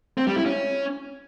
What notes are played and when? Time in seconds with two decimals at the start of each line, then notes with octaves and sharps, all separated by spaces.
0.17 C4
0.27 G3
0.36 E4
0.46 C#4